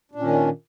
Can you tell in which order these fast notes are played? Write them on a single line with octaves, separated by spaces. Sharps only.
D4 A#2 C#4 D#3